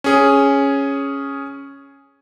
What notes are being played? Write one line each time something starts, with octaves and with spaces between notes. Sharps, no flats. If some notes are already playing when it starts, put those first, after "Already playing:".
C#4 G#4